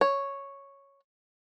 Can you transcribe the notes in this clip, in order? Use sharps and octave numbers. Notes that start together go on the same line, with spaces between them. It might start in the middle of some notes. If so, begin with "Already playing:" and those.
C#5